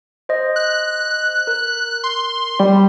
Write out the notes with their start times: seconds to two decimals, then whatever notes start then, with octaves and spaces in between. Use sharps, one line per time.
0.29 C5 D#5
0.56 F#6
1.47 A#4
2.04 C6
2.60 G3